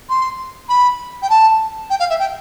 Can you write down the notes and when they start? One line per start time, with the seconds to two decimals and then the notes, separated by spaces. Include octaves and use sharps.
0.09 C6
0.69 B5
1.22 G5
1.29 A5
1.90 G5
1.99 F5
2.09 E5
2.19 G5